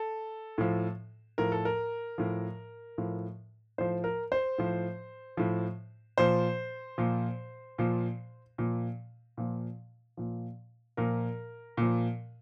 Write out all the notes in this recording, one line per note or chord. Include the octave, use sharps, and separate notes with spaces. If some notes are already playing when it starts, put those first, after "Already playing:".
Already playing: A4
A2 F3
A2 F3 A#4
A4
A#4
A2 F3
A2 F3
A2 F3 C5
A#4
C5
A2 F3
A2 F3
A#2 F3 C5
A#2 F3
A#2 F3
A#2 F3
A#2 F3
A#2 F3
A#2 F3 A#4
A#2 F3